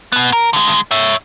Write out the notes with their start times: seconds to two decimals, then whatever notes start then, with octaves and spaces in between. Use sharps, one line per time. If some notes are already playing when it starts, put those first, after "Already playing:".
0.12 B2 B3
0.33 A#4
0.53 D3 G#3
0.91 C#5 E5